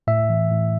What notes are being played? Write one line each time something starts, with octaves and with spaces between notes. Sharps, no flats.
A2 E5
E3
A2